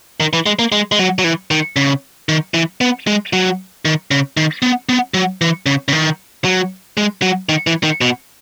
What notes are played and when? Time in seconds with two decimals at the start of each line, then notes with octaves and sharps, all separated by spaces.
0.20 D#3
0.33 E3
0.46 G#3
0.59 A#3
0.72 G#3
0.92 G#3
0.99 F#3
1.19 F#3
1.24 E3
1.51 D#3
1.76 C#3
2.29 D#3
2.54 E3
2.81 B3
3.07 G#3
3.33 F#3
3.85 D#3
4.11 C#3
4.37 D#3
4.62 B3
4.89 B3
5.14 F#3
5.41 E3
5.66 C#3
5.88 C#3
5.92 D#3
6.44 F#3
6.97 G#3
7.22 F#3
7.49 D#3
7.67 E3
7.83 D#3
8.01 B2